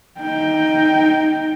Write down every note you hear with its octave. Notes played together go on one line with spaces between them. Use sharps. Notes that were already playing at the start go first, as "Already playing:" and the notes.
D#4 G5